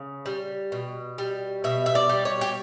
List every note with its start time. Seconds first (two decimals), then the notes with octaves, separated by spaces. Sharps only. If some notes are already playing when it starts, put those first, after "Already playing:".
Already playing: C#3
0.26 G3
0.72 B2
1.18 G3
1.64 B2 E5
1.86 E5
1.95 D5
2.09 G3
2.25 C#5
2.41 G4